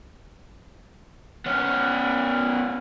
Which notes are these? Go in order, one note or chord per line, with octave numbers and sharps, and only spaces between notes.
B3 C#4